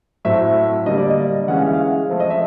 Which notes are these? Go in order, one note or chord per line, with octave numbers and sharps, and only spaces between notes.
A2 F#3 A3 C4 E5
D3 G3 A#3 D#5
D5
D#5
E3 G#3 C#4 F#5
F5
E5
F5
F3 A3 C4
D#5
E5